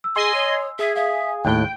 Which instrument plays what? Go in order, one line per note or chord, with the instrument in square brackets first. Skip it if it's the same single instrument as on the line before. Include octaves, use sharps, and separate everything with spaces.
[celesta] E6
[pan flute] G#4 [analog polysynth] D#5 G#5 C6
[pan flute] C#5
[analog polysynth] G#4 [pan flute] E5
[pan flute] E5 [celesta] F5
[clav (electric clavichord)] D#2 A2 [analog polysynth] G5 [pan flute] F#6